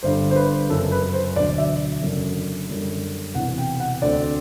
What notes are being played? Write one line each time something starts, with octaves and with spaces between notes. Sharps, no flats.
G1 G2 D3 G3 C5
C5
B4
F#1 F#2 F#3 A4
B4
C5
E1 D2 D3 F#3 D5
E5
F#1 F#2 D3 F#3
F#2 D3 G3
E1 E2 C3 E3 F#5
G5
F#5
D2 D3 A3 C4 D5